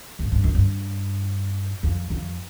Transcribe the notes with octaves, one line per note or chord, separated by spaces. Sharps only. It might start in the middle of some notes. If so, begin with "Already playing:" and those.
G#2
G2
F#2
G2
F2
F2